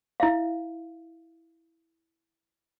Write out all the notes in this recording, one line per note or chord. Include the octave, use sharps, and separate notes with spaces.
E4 E5 F5